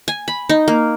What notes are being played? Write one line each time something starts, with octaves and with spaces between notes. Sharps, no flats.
G#5
B5
D#4
A#3